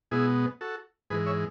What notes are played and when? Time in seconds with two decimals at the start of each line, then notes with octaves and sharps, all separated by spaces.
0.11 B2 G#3 B3 E4 G#4
0.61 F#4 A4
1.10 G#2 E3 G#3 G#4 B4
1.26 C#5 E5